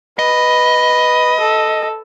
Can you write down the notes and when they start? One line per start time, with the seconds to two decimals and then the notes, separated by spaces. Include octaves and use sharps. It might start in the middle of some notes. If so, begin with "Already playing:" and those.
0.19 B4 D#5
1.40 A4